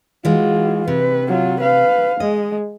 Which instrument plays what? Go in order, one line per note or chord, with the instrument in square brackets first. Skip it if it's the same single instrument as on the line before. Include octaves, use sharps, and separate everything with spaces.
[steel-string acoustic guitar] E3 G#3 [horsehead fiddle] F4 F#4
[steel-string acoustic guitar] C3 [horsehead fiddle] B4
[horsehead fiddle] F#3 F4
B4 F5
[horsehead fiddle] G#3 [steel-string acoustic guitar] D#5